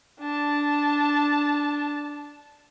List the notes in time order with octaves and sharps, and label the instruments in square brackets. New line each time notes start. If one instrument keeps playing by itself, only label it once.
[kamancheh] D4 A5